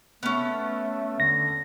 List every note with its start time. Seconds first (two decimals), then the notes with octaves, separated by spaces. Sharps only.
0.23 A3 B3 C#4
1.20 D3 A#6